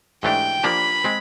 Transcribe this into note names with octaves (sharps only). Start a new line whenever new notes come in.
G#2 E3 A3 D4 G4 G5
F3 A#3 D4 G4 B5
G#3 C4